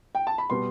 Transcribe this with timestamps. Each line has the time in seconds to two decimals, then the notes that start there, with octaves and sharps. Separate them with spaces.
0.15 G5
0.27 A5
0.38 B5
0.50 B2 G3 B3 C6